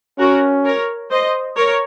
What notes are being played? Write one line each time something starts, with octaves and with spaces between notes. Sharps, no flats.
C#4 F#4 A#4
A#4 C#5
C5 D#5
A#4 C#5